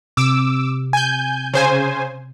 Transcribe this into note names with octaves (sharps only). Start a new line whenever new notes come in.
C3 D6 E6
G#5 G6
C#3 C5 G#5